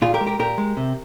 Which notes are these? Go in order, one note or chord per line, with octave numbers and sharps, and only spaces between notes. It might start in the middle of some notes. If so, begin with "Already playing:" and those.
A#2 F4 G#4
G4 A#4
G#3
G4 A#4
A#2 G4 A#4
G#3
C3